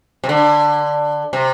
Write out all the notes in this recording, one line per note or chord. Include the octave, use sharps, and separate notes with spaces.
C3
D3
C3